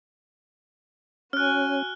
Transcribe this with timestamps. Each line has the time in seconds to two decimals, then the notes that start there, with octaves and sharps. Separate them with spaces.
1.33 C#4 F#4 G#5 F6 F#6